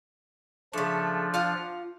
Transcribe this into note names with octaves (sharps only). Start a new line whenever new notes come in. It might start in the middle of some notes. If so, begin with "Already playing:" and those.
C#3 F3 A3 D4
F4 F5 F#5